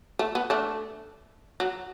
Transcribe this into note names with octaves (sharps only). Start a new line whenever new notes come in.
A3
B3
A3 D4
F#3